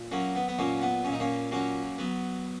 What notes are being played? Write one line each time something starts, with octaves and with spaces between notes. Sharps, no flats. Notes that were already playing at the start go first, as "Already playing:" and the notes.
Already playing: A#2
F#3 A#3 C#4
B3
B3
A#2 A#3 C#4
B3
A#2 C#4
D#4
A#3 C#4
F#3 A#3 C#4
F#3 B3